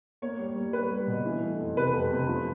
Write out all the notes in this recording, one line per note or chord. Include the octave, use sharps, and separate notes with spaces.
A#3 C#5
G3
G3
G3 B4
G3
B2
E3
A3
F2
C3 B4
F2
C3
F3